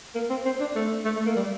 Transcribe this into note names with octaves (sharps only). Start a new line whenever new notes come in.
A#3
C4
C4
D4
A3
A3
A3
A#3
G3